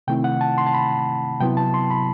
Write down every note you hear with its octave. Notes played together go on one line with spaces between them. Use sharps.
C3 D#3 A3 C4 E4 G5
F#5
A5
C6
A5
B5
C3 F#3 B3 E4 G5
A5
C6
B5